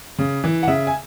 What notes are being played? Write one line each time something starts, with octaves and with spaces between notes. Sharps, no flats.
C#3
E3
F#5
C#3 E5
G#5